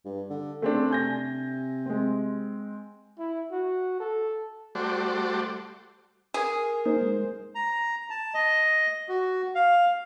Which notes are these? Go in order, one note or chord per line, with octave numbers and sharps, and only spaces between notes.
G2
D3
C#3 A3 C4 D4
C3 G#5 G6 A#6
G#3 C4
E4
F#4
A4
G3 A3 F#4 C5 D5
G#4 A#4
A#3 D#4 C5
G#3
A#5
A5
D#5
F#4
F5